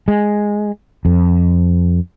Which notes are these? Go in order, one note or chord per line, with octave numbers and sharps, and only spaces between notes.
G#3
F2